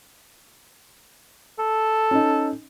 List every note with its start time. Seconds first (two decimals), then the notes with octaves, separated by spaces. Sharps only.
1.59 A4
2.11 C#4 D#4